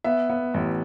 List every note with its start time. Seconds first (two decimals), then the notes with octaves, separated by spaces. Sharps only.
0.04 B3 E5
0.30 B3
0.54 A1